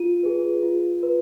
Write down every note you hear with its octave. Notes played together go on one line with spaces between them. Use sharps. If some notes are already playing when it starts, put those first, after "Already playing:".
Already playing: F4 D#7
G#4 B4
F4
B4